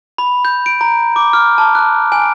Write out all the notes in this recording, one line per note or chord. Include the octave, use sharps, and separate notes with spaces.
B5
G6
D7
A#5
D6
F6
A5
F#6
G#5